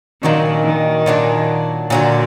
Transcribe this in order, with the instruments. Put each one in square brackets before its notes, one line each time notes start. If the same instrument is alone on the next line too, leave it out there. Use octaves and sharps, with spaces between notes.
[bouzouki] A#2 F#3 D4 F#4 [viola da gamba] D#3
[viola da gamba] D#3
[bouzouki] A#2 F#3 D4 F#4
[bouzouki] A#2 F#3 D4 F#4 [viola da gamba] D3